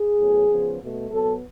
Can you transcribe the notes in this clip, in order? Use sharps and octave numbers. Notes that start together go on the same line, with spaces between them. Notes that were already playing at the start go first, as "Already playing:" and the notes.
Already playing: G#4
A2 F#3 B3
C#3 F3 B3
B2 A3
B2 F#3 B3 A4